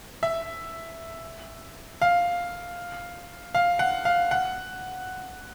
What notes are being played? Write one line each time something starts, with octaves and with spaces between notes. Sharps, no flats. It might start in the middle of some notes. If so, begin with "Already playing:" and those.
E5
F5
F5
F#5
F5
F#5